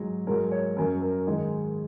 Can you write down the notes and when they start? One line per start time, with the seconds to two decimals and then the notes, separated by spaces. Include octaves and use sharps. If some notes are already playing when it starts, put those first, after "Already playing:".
Already playing: G#2 F#3
0.27 G#2 F#3 A#4
0.51 C#5
0.77 F#2 F#3 A#4
1.02 A#4
1.27 G#2 D#3 G#3